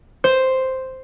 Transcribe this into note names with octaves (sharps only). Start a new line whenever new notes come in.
C5